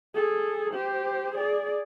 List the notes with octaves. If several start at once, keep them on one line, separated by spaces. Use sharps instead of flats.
G#4 A4
G4 C5
G#4 D5